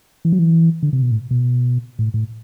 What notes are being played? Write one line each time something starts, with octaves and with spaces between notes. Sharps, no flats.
E3
F#3
E3
D3
C3
B2
A2
B2
A2
A2